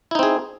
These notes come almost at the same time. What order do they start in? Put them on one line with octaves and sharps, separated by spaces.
E4 D#4 C4 G#4